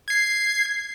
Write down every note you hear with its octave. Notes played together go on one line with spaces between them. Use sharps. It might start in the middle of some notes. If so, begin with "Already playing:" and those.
G#6 C7